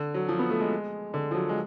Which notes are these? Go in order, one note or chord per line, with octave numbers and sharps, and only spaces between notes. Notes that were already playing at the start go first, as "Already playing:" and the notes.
Already playing: D3
F#3
F3
B3
A3
G#3
D3
F3
F#3
G#3